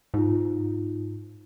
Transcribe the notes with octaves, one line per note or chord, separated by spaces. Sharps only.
G#2 D#4 F4